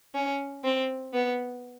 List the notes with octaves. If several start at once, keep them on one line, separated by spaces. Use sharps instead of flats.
C#4
C4
B3